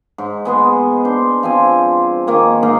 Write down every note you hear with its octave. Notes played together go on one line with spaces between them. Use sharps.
G#2
G#3 B3 G#4
D4 C5
F3 C4 G#5
D#3 A#3 G#5
G#2 A#3 D#4 F5